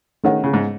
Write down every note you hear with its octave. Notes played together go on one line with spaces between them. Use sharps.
D#3 A3 C#4 G#4 C#5 F#5
C#3
G#2